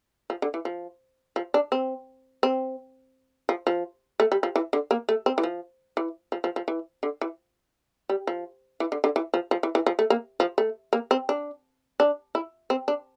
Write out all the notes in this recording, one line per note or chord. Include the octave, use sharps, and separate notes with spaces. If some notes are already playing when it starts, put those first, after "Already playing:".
F3
D3
E3
F3
F3
D4
C4
C4
F3
F3
A3
G3
F3
E3
D3
A#3
A3
C4
E3
F3
E3
F3
F3
F3
E3
D3
E3
G3
F3
E3
D3
D3
E3
F3
F3
E3
E3
F3
A3
A#3
F3
A3
A#3
C4
D4
D4
E4
C4
D4